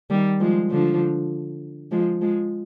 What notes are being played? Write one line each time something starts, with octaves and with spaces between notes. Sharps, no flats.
D#3 G3
F3 G#3
D3 F3
F3 G#3
F3 G#3